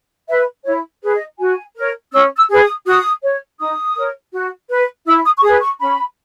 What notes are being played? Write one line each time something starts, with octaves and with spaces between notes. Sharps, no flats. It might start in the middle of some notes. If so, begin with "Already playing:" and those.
B4 E5
E4 C#5
G#4 B4
D#5
F#4 G#5
A#4 C#5
C#4 E6
E6
G#4 B4
D#6
F#4 D#6
C#5
D#4 D#6
A#4 C#5
F#4
B4
E4 E6
D#6
C#6
G#4 B4 D#6
C#6
C#4 B5